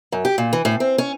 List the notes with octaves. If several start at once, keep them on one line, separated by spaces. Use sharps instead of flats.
F#2
G4
A#2
E3
A2
C4
C#4